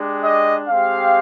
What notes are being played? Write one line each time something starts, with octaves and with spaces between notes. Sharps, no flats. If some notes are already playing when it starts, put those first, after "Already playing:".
Already playing: G#3 D4 G4
D#5
G#3 C4 G4 F5